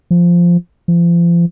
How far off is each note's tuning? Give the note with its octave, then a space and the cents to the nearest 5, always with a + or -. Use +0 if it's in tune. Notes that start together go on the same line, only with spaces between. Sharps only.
F3 -5
F3 -35